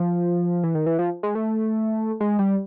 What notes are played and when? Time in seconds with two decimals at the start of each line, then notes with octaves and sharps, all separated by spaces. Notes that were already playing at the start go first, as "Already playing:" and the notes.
Already playing: F3
0.63 E3
0.75 D#3
0.86 E3
0.99 F3
1.23 G#3
1.35 A3
2.20 G#3
2.39 G3